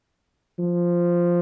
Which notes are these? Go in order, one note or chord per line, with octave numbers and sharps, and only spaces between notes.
F3